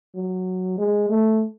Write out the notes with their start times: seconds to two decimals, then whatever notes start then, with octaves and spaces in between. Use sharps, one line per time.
0.15 F#3
0.78 G#3
1.10 A3